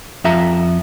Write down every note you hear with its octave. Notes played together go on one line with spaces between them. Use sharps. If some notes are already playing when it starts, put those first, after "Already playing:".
F2 E5 A#5